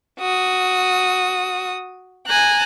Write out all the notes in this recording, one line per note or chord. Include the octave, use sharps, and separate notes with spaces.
F#4 D#6
G#5 A#5 F#6